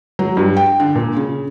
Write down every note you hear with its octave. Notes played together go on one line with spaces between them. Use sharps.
F#3
G2
G5
D3
A#2
C#3